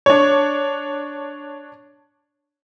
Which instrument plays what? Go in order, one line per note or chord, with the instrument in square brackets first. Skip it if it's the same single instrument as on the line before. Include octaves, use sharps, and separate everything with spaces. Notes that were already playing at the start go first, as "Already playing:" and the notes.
[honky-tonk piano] D4 C#5